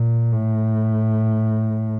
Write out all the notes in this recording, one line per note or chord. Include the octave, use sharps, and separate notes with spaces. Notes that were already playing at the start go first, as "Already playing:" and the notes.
Already playing: A#2
A2